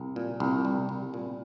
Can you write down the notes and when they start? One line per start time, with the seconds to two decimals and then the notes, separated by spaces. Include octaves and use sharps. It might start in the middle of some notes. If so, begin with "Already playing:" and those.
Already playing: C2
0.16 A#2
0.40 C2
0.65 G3
0.89 C2
1.14 A#2